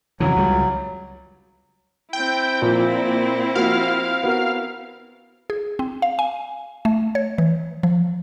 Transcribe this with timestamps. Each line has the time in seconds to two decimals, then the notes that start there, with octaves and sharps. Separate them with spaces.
0.20 F2 C#3 E3 F#3
0.36 C#2 C#3 G3
2.13 C4 E4 G5
2.62 A#2 F3
3.55 F3 A#3 F#4 F5
4.23 B3 F#4 A#4
5.50 G#4
5.79 C4
6.02 F5
6.19 G#5
6.85 A3
7.15 C#5
7.38 E3
7.83 F3